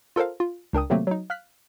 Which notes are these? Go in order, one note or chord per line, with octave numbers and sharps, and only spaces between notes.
F4 A4 A#4 C5 F5
F4
C#2 D4 A#4 G5 D#6
C3 D#3 F#3 A3 A#3 C4
F#3 D#4
F5 F6 F#6 B6